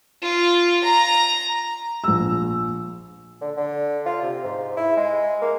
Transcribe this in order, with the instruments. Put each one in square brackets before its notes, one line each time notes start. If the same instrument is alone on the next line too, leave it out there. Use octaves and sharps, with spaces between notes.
[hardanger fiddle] F4
A#5
[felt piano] A#1 E6
[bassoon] D3
D3
F4
C3
G#2
E4
G#3
A#3